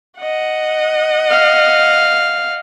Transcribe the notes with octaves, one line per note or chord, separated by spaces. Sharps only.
D#5 F#5
F5